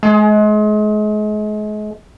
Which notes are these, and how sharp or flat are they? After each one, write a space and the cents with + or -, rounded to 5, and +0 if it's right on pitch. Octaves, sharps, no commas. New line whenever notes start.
G#3 +35